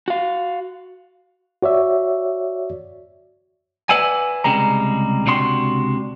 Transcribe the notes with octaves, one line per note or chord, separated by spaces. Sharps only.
F#4 F5
F#4 C#5 D5 E5
B4 D5 E5 F#5 G#5
C2 C#3 G3 G#3 A#5
C#2 C3 D4 F#4 C6